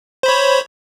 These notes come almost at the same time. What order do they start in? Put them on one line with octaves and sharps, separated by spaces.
C5 B5 C#5